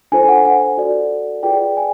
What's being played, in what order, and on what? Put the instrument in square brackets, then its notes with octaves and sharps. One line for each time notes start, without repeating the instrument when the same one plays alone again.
[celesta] D4 F4 A4 C5 G#5
F#5
F#5
F#4 A4 D5
F4 G#4 B4 D5 G5
G#5